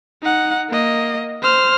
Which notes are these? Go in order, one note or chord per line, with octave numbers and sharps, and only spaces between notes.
D#4 F#5
A#3 D#5
C5 F6